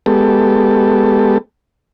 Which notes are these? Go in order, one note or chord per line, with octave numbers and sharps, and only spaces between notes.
G#3 B3 G4 A4